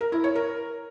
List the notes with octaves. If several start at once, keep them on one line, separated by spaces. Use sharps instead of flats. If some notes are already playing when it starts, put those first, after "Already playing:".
A#4
E4
C#5
A#4